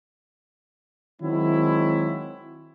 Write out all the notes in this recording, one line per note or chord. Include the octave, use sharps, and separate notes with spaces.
D#3 F#3 G#3 C4 E4